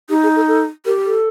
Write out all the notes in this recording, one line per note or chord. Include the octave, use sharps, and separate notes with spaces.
D#4 G4
G#4
A4
A4
G4 A#4
A4